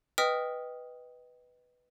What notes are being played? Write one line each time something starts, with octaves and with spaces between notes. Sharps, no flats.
B4 D#5 G5 D#6 F6 B6